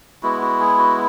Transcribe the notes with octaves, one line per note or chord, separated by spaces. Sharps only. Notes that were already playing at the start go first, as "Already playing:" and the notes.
G#3 B3 E4 F#4
F#4
G#4
F#4